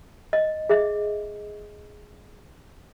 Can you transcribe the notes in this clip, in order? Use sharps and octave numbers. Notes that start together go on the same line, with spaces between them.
D#5
G#4 D#5 E5